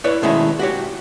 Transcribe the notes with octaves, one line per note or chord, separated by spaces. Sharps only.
E4 B4 C#5 D5
B2 D#3 G#3 A3 C#4 E4
F#4 G4 C#5